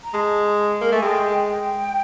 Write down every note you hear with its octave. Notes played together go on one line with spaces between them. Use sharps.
A#5
G#3 A5
A#3
A3 G#5
G#3 G5
G5